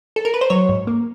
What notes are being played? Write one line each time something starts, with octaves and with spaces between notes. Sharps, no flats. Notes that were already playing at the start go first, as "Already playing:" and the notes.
A4
A#4
B4
C5
F#3 C#5
G#2
A#3